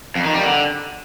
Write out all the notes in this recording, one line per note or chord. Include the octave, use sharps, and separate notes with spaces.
F2
D#3
G3
D3